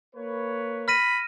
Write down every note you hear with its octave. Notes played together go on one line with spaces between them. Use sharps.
A#3 B4 C#5
B5 F6 A#6 D#7